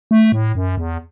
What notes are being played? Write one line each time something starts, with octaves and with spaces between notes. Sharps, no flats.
A3
A2
F#2
E2